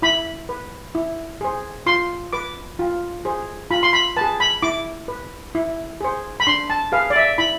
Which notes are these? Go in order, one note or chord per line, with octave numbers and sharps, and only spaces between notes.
E4 B5
B4
E4
G#4 C5
F4 C6
B4 D6
F4
G#4 C5
F4 B5
C6
B5
G#4 B4 A5
B5
E4 D6
B4
E4
G#4 C5
B5
D4 C6
A5
G#4 B4 F5
D5
E5
E4 B5